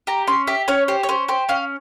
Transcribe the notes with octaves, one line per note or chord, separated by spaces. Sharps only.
G4 A#5
C#4 C6
G4 E5
C#4 C#5
G4 C5
C#5
C#4 C5
G4 C5
C#4 F5